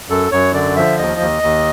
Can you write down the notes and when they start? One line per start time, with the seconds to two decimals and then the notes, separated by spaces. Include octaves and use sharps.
0.10 F#2 A4
0.32 F#2 C#5
0.54 D3 D5
0.76 F3 E5
0.98 D#2 D#5
1.20 D#2
1.43 D#2